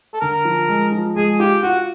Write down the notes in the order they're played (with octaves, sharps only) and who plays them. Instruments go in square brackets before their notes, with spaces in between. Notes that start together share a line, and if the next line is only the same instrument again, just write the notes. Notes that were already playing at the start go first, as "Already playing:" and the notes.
[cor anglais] A4
[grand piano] D3 [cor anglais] A#4
[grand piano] F3
G#3
F3
[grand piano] G#3 [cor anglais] G#4
[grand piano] F4 [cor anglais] G4
[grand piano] F4 [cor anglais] F#4